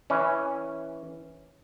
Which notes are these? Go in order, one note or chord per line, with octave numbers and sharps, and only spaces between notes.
E3 C#4